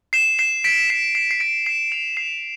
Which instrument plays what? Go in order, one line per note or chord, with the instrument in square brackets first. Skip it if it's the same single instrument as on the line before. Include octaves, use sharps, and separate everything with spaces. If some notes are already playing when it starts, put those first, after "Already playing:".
[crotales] C7 E7
C7 E7
B6 D7
C7 E7
C7 E7
C7
B6 D7
C7 E7
D7 F7
C7 E7